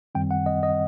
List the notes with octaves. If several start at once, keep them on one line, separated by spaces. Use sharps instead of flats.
F#2 D#3 G3 C4 G5
F#5
D#5
D#5